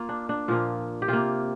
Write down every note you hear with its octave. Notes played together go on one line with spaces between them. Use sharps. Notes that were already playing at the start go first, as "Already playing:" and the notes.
Already playing: A#3 F4
D4
D4
A#2 F3 A#3 F4
G4
C3 A#3 F4